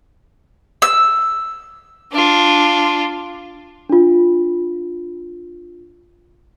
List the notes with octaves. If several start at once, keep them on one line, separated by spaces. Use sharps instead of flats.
E6
D4 F4
D4 F4